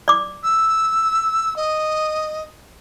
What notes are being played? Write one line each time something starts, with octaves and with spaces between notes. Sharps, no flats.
D5 D6
E6
D#5